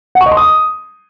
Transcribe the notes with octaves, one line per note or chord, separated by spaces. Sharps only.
F#5
C#6
D#5
C6
D#6